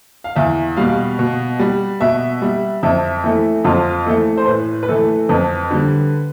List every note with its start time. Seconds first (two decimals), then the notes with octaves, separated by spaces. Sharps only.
0.24 F5
0.36 E2 E5
0.77 B2 G3 F5
1.19 B2
1.60 G3
2.00 B2 E5
2.42 G3
2.83 F2 E5
3.24 E3 A3
3.64 F2 F4
4.06 E3 A3 A4
4.37 C5
4.47 A2 B4
4.83 B4
4.88 E3 A3 A4
5.29 F2 B4
5.71 D3 G3